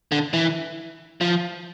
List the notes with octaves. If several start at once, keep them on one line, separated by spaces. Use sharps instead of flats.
D3
E3
F3